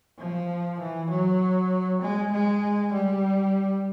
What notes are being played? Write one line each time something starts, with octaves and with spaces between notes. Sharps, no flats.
F3
E3
F#3
G#3
G#3
G3